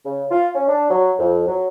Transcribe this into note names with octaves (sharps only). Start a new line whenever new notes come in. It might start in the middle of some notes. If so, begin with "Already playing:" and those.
C#3
F4
C#4
D4
F#3
F2
F#3